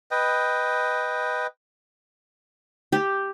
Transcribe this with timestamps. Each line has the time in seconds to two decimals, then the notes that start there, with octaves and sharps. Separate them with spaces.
0.11 B4 D#5 G5
2.92 G4